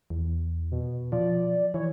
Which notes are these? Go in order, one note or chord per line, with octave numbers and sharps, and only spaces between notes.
E2
B2
F3 D5
E3 C#5